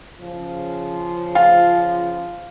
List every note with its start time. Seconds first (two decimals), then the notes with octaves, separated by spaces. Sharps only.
0.21 C#3 F3
1.35 F4